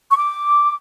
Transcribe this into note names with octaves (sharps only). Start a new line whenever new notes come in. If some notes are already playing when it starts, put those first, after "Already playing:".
C#6
D6